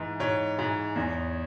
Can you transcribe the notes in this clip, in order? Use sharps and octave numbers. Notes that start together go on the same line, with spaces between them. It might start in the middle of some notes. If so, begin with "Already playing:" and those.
Already playing: G#2 E3
G#2 C#5
G#2
E2